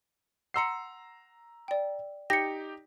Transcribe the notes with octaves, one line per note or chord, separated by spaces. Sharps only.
F#5 A#5 C6 E6 C7 C#7
D5 G5
D#4 G4 G5 A#6 C#7